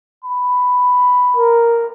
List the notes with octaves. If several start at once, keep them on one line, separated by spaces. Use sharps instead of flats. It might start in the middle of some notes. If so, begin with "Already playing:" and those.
B5
A#4